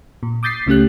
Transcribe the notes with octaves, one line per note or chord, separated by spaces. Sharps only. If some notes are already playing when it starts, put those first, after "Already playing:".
A#2
D6 D#6 G6 A6 B6 C7
C#2 C#3 A3 C#4 G4 F#6